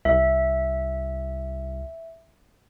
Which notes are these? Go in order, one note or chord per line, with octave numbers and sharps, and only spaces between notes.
C2 E5